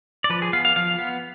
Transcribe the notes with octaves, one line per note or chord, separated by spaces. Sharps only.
D5
F3 B4
G#4
B3 F5
F5
F3 F5
B3